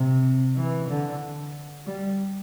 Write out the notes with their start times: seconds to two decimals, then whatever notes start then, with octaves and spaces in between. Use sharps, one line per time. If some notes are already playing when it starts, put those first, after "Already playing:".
Already playing: C3
0.56 E3
0.89 D3
1.87 G3